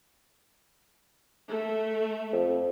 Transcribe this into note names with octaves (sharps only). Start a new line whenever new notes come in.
A3 A4
F2